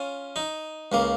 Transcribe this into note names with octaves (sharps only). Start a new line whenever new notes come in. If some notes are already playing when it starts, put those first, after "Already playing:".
Already playing: C#4 F4
D#4
C#2 C#3 A#3